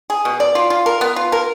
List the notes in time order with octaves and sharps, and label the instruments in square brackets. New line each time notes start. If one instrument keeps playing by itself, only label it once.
[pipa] G#4
B2
D5
F4
F4
A#4
B3
F4
A#4